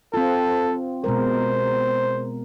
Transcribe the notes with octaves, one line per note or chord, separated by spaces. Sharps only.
C4 F4 A4
B2 G#3 A#4 C5